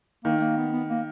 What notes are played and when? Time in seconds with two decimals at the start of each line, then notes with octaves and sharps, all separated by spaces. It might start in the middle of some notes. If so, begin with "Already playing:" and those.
0.24 D#3 A#3
0.41 A#3
0.57 B3
0.73 B3
0.89 A#3